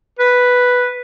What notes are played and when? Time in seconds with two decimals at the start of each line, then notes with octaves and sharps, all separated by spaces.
0.19 B4